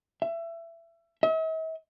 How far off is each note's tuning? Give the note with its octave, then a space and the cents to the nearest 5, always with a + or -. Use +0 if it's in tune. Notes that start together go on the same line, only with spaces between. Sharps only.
E5 +25
E5 -45